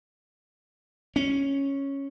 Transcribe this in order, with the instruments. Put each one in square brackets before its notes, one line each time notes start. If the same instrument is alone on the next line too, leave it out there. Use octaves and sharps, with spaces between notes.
[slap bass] C#4